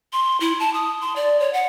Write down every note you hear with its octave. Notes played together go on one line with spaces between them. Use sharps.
C6
E4
A5
D#6
C6
D5
C#5
F#5